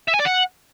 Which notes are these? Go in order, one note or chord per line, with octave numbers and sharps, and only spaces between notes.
E5
G#5
D5
F#5